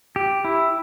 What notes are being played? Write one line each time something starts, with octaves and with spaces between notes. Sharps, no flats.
G4
E4